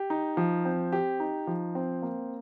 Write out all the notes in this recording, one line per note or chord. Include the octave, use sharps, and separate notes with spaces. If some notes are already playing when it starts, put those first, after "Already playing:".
Already playing: G4
D#4
F3
C4
G4
D#4
F3
C4
A#3